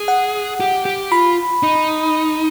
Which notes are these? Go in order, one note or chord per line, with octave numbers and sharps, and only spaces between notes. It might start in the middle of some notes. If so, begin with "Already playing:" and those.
Already playing: G#4
F#5
G4
G4
F4 B5
D#4